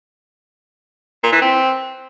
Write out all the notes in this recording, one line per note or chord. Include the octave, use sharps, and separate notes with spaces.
A#2
E3
C4